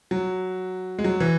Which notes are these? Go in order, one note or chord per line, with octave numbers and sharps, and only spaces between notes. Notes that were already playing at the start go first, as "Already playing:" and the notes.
F#3
G#3
F#3
E3